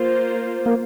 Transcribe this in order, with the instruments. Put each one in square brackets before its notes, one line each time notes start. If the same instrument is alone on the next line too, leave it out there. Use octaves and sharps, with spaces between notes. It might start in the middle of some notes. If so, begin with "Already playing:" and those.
Already playing: [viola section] A#3 F4 C5
[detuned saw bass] A#3